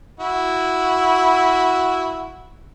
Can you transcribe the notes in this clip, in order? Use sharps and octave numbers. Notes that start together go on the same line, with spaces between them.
E4 F#4